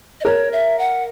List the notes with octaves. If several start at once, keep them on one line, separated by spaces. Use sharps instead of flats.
D#5
A#4 C#5
E5
F#5